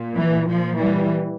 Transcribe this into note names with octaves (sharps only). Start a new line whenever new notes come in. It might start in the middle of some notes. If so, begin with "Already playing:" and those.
Already playing: A#2
E3
A#2 F3
E3 G3